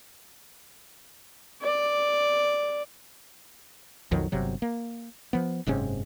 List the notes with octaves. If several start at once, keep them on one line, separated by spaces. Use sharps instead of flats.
D5
B1 F2 D#3 F#3
G1 C3 F#3
A#3
F3 B3
F#1 G#2 C3 C#4